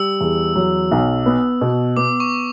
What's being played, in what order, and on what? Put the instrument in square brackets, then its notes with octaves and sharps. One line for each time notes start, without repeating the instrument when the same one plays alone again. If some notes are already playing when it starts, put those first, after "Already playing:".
Already playing: [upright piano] G3 [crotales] E6
[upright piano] E2
F#3
B1
B3
B2
[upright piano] B3 [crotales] D6
[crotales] C#6